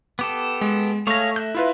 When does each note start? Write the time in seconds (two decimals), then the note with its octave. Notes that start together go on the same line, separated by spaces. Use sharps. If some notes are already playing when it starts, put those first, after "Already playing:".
0.19 B3 G4 A4
0.61 G#3
1.07 A3 G#4 C#5 F5 A#6
1.36 E5 F#6 G6
1.55 E4 F4 B4